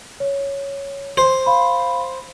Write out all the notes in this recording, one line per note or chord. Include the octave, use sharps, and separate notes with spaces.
C#5
C5
F5 B5